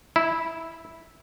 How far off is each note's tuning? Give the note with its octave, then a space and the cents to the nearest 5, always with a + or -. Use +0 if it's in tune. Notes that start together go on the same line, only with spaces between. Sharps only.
E4 -10